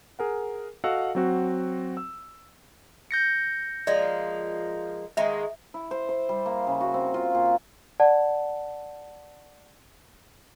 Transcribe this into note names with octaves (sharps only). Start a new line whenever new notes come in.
G#4 A#4 F#5
F#4 A4 D#5 F5 F#5 E6
F#3 C4 F#4
E6
G6 A#6 C#7
F3 G#3 A#3 D5
D#3 G#3 A#3 E5
E4
C5
C5
G3
A#3
C#3
F#4
C4
F4
A#2
D5 F#5 A5